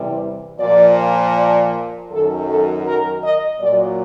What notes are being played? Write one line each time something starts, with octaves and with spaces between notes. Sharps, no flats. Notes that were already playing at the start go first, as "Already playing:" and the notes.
Already playing: E2 C3 E3 G3
A#2 F3 D5
D5
F#2 D#3 F#3 A4
A4
A#4
D#5
A#2 F#3 D5